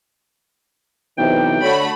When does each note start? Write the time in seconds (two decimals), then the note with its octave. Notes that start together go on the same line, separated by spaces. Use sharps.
1.18 B1 C3 E3 G5
1.62 D3 A3 F#4 C#5 B5